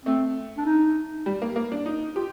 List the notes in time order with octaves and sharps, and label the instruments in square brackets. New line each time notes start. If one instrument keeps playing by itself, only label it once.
[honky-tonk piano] A3 [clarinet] C4
[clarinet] D4
D#4
[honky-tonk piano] G3
A#3
A#3
D4
D#4
[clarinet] F4 [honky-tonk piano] G4